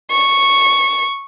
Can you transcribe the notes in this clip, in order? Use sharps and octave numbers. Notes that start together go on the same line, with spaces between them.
C#6